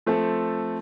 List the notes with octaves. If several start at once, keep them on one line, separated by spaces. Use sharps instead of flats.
F3 A3 C4 A4